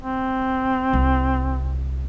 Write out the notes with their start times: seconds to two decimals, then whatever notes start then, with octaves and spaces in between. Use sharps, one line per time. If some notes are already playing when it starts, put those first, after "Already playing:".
0.01 C4
0.93 C2